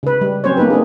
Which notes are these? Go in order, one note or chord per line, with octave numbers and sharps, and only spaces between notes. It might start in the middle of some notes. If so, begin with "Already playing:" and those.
C#3 B4
G3
F#3 C4 C#4 C5 C#5
A#3 B3 D#4 G4 B4
A#3 C4 D4 D#4 G#4